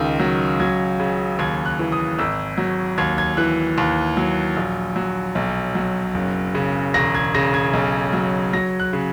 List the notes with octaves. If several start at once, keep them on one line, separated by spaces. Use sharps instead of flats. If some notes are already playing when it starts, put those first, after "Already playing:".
Already playing: C#2 D#3
F#3
F#3 G#6
C#3
D#2 G#6
F#6
E3
D#6
G#1 E6
F#3
D#2 G#6
G#6
E3 F#6
D#2
F#3
A#1
F#3
B1
F#3
F#1
C#3
E1 A#6
G#6
C#3 A#6
G#6
B1
F#3
F#3 A#6
F#6
C#3